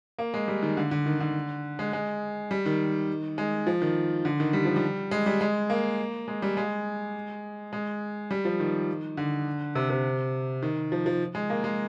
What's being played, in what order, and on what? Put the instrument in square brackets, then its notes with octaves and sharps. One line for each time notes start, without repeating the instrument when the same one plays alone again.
[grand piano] A#3
G#3
G3
D#3
D3
D3
D#3
D3
G#3
G#3
G3
D#3
G#3
F3
D#3
D3
D#3
G3
F3
G3
G#3
G3
G#3
A#3
G#3
G3
G#3
G#3
G3
F3
D#3
D3
C3
C3
D#3
F3
F3
G#3
A#3
G#3